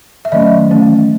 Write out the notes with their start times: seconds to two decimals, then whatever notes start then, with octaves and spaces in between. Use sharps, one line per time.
0.25 E5
0.32 D#3 F#3 A3 C#4 D#5
0.70 E3 A3 C#4